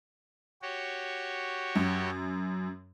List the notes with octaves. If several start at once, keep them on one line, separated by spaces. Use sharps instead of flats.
F#4 G4 C#5
F#2